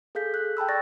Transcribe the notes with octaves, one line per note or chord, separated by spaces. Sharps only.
G#4 A4 F5 G6 B6
F#6
G5 A5 B5 E6
D5 C#6 A6 A#6